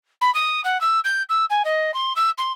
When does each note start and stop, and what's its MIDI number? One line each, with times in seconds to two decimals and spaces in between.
0.21 0.33 83
0.35 0.61 87
0.64 0.80 78
0.81 1.00 88
1.05 1.23 91
1.29 1.45 88
1.50 1.63 80
1.65 1.94 75
1.94 2.13 84
2.16 2.30 88
2.38 2.53 84